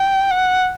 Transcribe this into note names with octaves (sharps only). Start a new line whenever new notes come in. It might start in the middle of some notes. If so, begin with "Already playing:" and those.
Already playing: G5
F#5